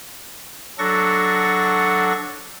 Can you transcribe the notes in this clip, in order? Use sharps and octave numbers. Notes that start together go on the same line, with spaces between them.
F#3 D4 A4 F#5 C#6 A#6